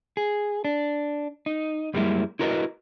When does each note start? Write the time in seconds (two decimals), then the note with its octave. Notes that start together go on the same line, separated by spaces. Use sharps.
0.17 G#4
0.65 D4
1.46 D#4
1.94 F#2 G3 G#3 A#3 E4
2.39 E4 F#4 A#4 B4 D5 D#5